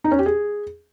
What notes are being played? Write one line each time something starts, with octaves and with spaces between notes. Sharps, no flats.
D#4
C#4
G4
G#4